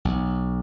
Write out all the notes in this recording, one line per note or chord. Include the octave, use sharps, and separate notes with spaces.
B1